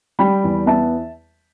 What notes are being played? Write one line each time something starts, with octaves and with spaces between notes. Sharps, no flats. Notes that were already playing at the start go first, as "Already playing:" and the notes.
G3 G5 B5
E2
B3 E5 A5